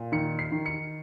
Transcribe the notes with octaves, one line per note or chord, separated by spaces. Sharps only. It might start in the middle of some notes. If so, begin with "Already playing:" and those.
Already playing: A#2
D#3 C#7
C7
D#3
C#7